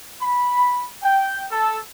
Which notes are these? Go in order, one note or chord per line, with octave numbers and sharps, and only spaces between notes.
B5
G5
A4